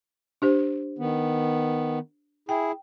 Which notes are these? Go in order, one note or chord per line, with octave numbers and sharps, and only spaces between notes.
D4 G4 C5
D#3 B3
E4 G#4 G5